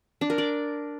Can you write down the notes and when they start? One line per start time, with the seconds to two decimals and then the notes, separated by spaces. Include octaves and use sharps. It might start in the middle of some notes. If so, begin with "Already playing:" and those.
0.21 D4
0.30 A#4
0.38 D5